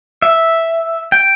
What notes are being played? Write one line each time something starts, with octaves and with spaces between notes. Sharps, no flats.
E5
G5